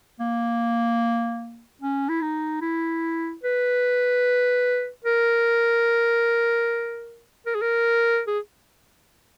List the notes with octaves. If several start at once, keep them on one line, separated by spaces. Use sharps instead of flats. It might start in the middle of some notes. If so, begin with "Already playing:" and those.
A#3
C#4
E4
D#4
E4
B4
A#4
A#4
G#4
A#4
G#4